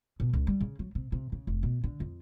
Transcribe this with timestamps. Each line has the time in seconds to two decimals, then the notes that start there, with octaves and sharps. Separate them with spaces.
0.20 B2
0.33 C#2
0.47 G3
0.61 C#3
0.79 F#3
0.95 C3
1.12 C3
1.32 C#3
1.47 F1
1.63 B2
1.84 D3
2.00 F2